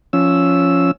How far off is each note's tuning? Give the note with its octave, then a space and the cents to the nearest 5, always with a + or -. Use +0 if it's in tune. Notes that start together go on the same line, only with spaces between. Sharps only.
F3 +0 C#4 +5 E6 +0